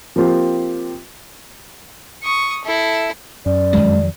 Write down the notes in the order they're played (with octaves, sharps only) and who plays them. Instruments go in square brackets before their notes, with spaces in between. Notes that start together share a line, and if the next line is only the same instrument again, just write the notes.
[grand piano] F3 A#3 C4 F4 G4
[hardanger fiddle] C#6 D#6
E4 A4
[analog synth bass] F#2 [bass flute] D5
[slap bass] F2 D#3 F#3 [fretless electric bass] G#3